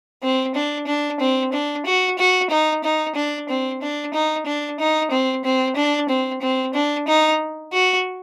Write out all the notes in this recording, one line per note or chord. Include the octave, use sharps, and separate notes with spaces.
C4
D4
D4
C4
D4
F#4
F#4
D#4
D#4
D4
C4
D4
D#4
D4
D#4
C4
C4
D4
C4
C4
D4
D#4
F#4